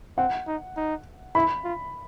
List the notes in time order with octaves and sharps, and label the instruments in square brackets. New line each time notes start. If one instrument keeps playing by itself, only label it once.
[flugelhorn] C4 [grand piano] F#5
[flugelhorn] D#4
D#4
[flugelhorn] E4 [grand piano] B5
[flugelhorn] F4